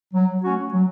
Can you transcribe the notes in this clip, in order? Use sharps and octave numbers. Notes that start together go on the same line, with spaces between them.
F#3
A3 C#4 F#4
F#3